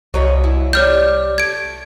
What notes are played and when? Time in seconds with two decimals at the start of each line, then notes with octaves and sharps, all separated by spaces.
0.14 C2 F#3 C#5 D#5
0.44 E4
0.73 G3 C#5 F6 G6
1.38 A3 G#6 D7